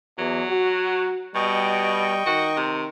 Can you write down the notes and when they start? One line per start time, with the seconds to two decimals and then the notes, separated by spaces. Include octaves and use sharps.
0.18 E2 F#3
0.50 F#4
1.35 B2 G3 D#5 G5 C#6
2.26 D#3 F#4
2.57 C3